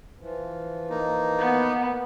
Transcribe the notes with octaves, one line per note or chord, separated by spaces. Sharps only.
E3 F3
A#3 D#4
B3